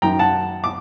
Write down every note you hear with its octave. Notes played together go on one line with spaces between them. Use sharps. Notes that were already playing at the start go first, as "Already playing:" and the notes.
F#2 D#3 G5 A#5
F#5 A5
D6